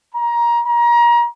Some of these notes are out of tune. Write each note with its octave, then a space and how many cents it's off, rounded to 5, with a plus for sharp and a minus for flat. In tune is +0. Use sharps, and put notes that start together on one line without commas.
A#5 +20
A#5 +30